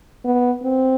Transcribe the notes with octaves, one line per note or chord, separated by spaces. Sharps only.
B3
C4